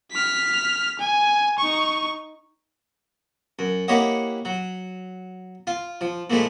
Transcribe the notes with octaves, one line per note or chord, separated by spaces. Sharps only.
F6 B6
G#5
D#4 C#6
F#2
A#3 E4 G4 C#5 D#5 F#5
F#3
F4
F3
A#2 F3 G#3 A3 E4